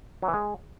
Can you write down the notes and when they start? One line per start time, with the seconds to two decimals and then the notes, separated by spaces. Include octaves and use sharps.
0.22 F#3
0.28 E3
0.34 G#3